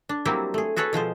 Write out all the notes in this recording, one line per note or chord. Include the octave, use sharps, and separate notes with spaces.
D4
F#3 G3 A#3 C4 E4 G4
A3 G#4
F#4 G#4 A4 B4 C#5
B2 F3 G#3 C5